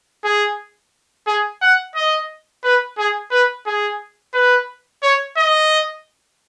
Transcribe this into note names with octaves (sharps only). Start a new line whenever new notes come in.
G#4
G#4
F#5
D#5
B4
G#4
B4
G#4
B4
C#5
D#5